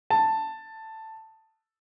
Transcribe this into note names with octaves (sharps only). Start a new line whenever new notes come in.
A5